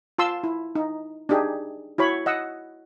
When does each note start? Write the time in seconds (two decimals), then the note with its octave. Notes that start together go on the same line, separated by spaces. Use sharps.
0.19 F4 A5 C6 E6
0.44 E4
0.75 D#4
1.29 D4 D#4 G4 G#4
1.98 E4 F#4 C#5 B5
2.26 D#5 F#5 E6